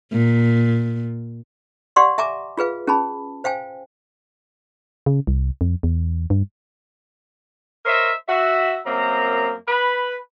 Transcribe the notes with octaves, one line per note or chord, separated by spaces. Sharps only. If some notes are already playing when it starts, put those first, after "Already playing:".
A#2
G4 D5 F5 F#5 C6 C#6
E5 G#5 A#5 D6
F4 G#4 B4 F5
C#4 G#4 A5 B5
C5 F5 G5 G#5
C#3
C2
F2
E2
G2
A#4 C5 C#5 D#5 E5
F#4 E5
F#2 A#3 C4 A#5
B4 B5